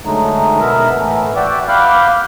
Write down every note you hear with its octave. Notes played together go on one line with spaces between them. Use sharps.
D3 F#3 G#3 A3 D#4
B2 B3 A#4 E5
A2 E3 A3
F#4 D5 E5 G5
F5 F#5 B5 D6 F6 G6